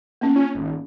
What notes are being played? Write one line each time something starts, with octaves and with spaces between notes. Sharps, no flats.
A#3 B3 C#4
C#4 F4
G#1